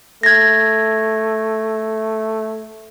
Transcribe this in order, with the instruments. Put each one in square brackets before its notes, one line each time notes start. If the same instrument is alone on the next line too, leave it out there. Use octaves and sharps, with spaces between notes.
[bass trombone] A3 [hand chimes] G#6 A#6